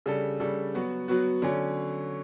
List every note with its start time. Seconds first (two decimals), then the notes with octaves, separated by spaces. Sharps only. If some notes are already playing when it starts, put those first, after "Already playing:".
0.06 C#3 G3 D4 A4
0.40 C#3 G3 D4 A4
0.74 F#3 B3 F#4
1.08 F#3 B3 F#4
1.42 D3 F#3 C#4